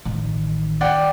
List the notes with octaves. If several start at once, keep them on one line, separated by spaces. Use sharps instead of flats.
A1 D#3
D5 F#5 G5